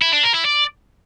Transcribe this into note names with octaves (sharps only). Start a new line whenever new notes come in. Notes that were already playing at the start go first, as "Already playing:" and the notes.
E4
D4
A#4
E4
D5